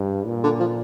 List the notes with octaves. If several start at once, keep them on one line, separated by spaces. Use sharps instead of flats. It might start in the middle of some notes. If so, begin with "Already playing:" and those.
Already playing: G2
A#2
D3
F3